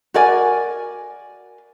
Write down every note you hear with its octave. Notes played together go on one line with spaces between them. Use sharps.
F#4 A#4 D5 G#5